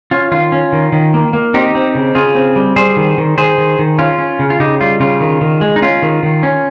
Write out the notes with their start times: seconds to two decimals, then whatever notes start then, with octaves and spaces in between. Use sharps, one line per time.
0.11 C#4 F4
0.32 D#3 F4
0.52 C#4
0.73 D#3
0.92 D#3
1.14 A#3
1.33 A#3
1.54 C4 D#4 G4
1.75 C4
1.95 C#3
2.15 C#3 F4 G#4
2.35 C4
2.56 G3
2.76 G3 G#4 C5
2.97 D#3
3.18 D#3
3.38 D#3 G#4 C5
3.58 D#3
3.79 D#3
3.98 C#4 F4
4.19 C#4
4.39 C#3
4.50 F4
4.60 C#3 D#4 G4
4.81 G3 F4
5.00 C#3 F4
5.21 D#3
5.41 D#3
5.61 G#3
5.76 D#4
5.82 C#4 F4
6.02 D#3
6.23 D#3
6.43 C#4